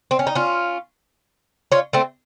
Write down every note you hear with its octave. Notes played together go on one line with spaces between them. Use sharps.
C4
C#4
D#4
C#4 F4
C#4 F4
A3 C4